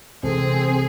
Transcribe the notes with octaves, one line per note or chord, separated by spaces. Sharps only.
A#1 C3 E3 G#3 C4 G#4 A4